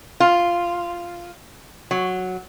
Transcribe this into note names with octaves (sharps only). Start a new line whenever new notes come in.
F4
F#3